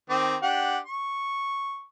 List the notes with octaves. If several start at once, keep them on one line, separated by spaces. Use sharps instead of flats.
D#3 C4 D6
D4 G4 F#5
C#6